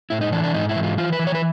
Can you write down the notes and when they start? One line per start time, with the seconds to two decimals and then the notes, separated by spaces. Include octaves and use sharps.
0.10 A2 E4
0.21 D#4
0.32 E3 D4
0.44 D4
0.54 G#2 D#4
0.69 E4
0.76 E3
0.83 F4
0.97 E3 F4
1.12 B4
1.19 E3
1.27 C#5
1.35 B4